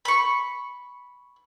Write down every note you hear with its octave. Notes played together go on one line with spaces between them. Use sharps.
B5 C#6